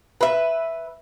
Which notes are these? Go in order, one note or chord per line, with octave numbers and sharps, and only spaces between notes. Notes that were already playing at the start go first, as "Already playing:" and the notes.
B4 E5